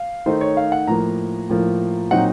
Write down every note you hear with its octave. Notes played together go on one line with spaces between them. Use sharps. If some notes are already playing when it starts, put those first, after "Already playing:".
Already playing: F5
D#3 A3 D#4 C5
C#5
F5
F#5
A2 F3 A#3 A#5
A2 F3 A#3
A#2 F#3 C4 D#4 F#5